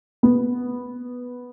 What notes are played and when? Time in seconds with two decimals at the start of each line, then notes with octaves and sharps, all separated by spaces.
0.23 B3